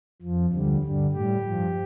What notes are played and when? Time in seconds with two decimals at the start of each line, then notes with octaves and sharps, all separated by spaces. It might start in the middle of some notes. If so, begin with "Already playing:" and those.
0.22 F2 F3
0.53 D2 D3 G3
0.83 G2 D3 G3
1.12 A2 G3 G4
1.43 G2 F3